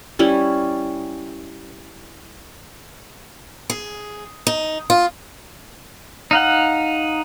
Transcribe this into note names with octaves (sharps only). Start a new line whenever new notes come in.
G3 C#4 E4
G#4
D#4
F4
D#4 F5 F#5